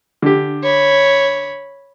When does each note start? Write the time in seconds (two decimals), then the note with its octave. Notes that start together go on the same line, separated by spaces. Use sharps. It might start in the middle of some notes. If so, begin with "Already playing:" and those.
0.22 D3 G4
0.64 C#5 B5